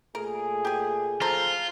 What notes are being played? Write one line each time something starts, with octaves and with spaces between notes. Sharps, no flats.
A#2 A3 G#4 A#4
G4 G#5
F3 F4 A4 A#5